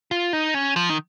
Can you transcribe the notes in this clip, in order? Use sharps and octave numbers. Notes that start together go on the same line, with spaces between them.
F4
D#4
C#4
F3
D#3